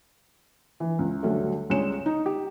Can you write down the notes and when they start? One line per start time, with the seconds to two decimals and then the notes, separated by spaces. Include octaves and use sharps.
0.80 E3
0.99 C#2
1.23 D2 G2 F#3 G3 A3
1.70 C#2 G3 G#3 C#5 C#7 E7
2.06 D#4
2.26 G4